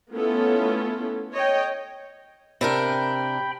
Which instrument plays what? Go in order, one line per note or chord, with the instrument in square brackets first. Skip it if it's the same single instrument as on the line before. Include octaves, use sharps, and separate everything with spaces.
[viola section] A3 B3 C#4 E4 F4 A4
C#5 D#5 G5
[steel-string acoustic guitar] C3 D4 A#4 [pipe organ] G5 B5